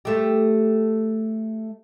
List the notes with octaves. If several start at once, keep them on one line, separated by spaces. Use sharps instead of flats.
A3 G4